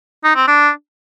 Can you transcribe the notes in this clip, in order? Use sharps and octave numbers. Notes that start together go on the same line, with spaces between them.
D#4
C4
D4